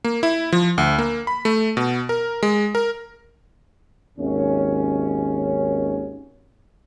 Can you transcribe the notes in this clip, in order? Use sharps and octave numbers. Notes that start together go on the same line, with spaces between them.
A#3
E4
F3
D2
A#3
B5
A3
B2
A#4
G#3
A#4
G#1 D#2 C#4